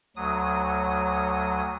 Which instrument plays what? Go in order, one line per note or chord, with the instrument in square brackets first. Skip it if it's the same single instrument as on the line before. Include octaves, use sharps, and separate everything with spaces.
[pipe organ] D2 F#3 D#6